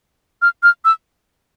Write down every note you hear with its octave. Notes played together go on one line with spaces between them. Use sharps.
F6
F6
E6